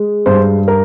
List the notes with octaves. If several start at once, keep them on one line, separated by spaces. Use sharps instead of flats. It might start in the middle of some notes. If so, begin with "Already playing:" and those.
Already playing: G#3
G2 C5
A#4